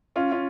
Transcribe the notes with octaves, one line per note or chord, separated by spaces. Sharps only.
C#4 F4
C#4 F4